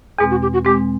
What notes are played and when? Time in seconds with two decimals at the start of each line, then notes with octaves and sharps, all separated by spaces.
0.18 E2 B2 G#3 C4 G#4
0.30 F#4
0.42 G4
0.53 F#4
0.64 E2 B2 G#3 C4 G4